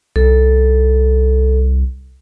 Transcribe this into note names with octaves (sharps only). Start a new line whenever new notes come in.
C2 A4